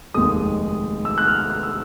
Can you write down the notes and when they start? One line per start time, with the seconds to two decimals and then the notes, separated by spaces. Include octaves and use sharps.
0.14 F1 D#2 D#3 G#3 D#6
1.05 E6
1.18 F#6
1.27 F6
1.50 F#6
1.63 E6